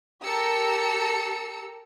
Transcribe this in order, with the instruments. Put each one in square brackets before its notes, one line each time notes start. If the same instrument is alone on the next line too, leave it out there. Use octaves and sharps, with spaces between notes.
[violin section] G4 A4 A#4 A#5 E6 C#7